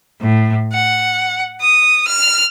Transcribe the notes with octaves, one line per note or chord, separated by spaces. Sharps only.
A2
F#5
D#6
F6